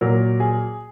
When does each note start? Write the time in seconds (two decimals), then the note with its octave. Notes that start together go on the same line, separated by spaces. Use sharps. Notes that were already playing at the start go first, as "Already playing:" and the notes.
0.01 A#2 F#3 A#4
0.40 G#4